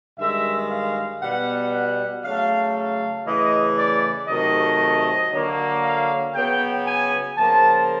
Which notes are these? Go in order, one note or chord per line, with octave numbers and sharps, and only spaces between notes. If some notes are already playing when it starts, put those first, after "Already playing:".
G2 D#3 G#3 E5
F5
B2 G3 B3 F#5
F#5
C#3 F#3 A3 F5
F5
C#3 E3 A3 D#5
D5
C3 D#3 F#3 A3 D#5
D3 F#3 A#3
F5
C#3 F#3 B3 G5
G#5
C#3 F3 A#3 A5